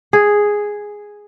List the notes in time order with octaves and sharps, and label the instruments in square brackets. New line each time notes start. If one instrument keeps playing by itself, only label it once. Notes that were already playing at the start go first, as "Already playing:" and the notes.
[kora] G#4